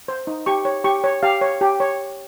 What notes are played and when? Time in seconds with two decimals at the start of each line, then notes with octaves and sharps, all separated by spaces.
0.08 C5
0.27 D#4
0.46 G4 C#6
0.65 C#5
0.84 G4 C#6
1.04 C#5
1.23 G4 F5
1.41 C#5
1.61 G4
1.80 C#5